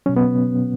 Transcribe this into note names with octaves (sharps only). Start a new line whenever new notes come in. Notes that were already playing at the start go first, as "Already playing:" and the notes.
B2 F#3 C#4
B3